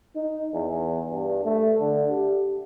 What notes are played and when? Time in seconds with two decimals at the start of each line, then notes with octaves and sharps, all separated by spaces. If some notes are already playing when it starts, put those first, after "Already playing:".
0.16 D#4
0.54 E2
1.10 G2
1.44 A3
1.80 D3
2.11 G4